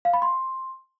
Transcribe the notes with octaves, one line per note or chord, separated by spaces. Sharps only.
F5
B5
C6